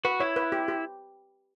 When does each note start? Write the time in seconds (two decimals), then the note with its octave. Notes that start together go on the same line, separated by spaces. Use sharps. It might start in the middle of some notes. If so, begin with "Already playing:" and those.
0.05 F#4 B4
0.20 E4 C#5
0.36 B4
0.52 G4
0.68 G4